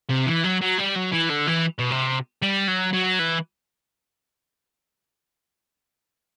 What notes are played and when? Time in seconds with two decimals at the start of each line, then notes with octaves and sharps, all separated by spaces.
0.10 C3
0.27 E3
0.44 F#3
0.61 F#3
0.78 G3
0.96 F#3
1.13 E3
1.30 D3
1.48 E3
1.79 B2
1.90 C3
2.42 G3
2.68 F#3
2.93 F#3
3.20 E3